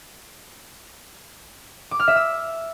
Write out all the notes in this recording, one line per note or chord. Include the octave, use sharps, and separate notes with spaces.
D6
F6
E5
E6